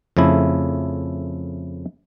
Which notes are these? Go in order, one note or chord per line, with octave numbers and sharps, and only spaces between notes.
F2 C#3 A3 E4